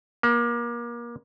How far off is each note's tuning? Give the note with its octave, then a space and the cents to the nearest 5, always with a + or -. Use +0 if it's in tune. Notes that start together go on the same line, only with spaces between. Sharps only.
A#3 +30